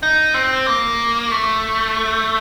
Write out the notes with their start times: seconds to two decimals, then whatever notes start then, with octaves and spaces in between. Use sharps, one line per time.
0.03 D#4
0.34 C4
0.67 A#3
1.31 A3